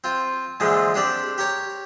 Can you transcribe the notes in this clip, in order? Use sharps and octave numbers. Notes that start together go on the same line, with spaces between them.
C4 F4
A#2 D3 E3 F3 G#3
C4 D4 G4 D5
G4 A#4 C#5